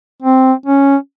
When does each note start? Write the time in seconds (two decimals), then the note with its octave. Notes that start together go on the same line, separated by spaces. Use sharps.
0.22 C4
0.66 C#4